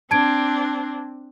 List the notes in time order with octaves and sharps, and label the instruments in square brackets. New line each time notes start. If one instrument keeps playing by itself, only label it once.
[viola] C4 D4 [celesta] A5 G#6 D7